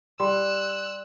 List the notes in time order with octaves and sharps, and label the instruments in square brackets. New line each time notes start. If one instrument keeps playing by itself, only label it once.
[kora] G3 [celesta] C6 [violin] E6 F#6